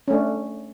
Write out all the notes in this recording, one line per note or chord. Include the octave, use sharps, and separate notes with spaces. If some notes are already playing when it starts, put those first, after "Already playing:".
A3 C#4 D4